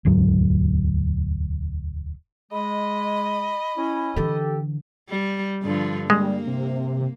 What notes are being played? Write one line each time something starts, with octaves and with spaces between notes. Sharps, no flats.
E1 D2 G#2 F#3
G#3 D#5 B5
C#4 E4
D3 E3 G4 A4
G3
G2 D3 F3
G3 G#3 A#3
C3